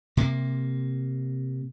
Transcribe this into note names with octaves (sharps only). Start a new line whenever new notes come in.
C3 A#3